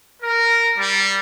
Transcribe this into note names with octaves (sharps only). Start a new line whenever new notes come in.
A#4
G3